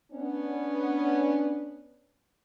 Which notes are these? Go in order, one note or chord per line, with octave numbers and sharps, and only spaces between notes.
B3 C#4 D4